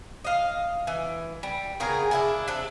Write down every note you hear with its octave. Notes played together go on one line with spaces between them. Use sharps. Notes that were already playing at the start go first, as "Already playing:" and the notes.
D#5 F5
E3
G3
C#3 B3 G#4 A#4
D4 E4 G#4
C3 D4